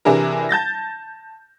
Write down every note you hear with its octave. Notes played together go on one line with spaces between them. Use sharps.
C3 E3 D4 E4 G#4 A#4
A5 G6 A6 A#6